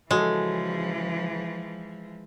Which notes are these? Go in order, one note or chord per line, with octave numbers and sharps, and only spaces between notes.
C#3 E3 F3 G#3 F#4 A4